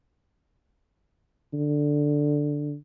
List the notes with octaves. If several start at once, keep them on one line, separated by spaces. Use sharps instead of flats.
D3